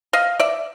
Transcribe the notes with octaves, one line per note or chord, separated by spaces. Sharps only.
D#5 F5
D5 E5